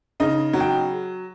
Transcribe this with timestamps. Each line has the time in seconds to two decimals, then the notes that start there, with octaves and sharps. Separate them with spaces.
0.20 C#3 D#4 D#5
0.53 F#3
0.60 G5